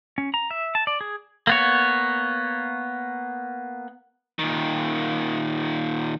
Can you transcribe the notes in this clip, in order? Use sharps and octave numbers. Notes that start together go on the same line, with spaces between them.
C#4
A#5
E5
A5
D5
G#4
A#3 B3 C#5
A#2 D#3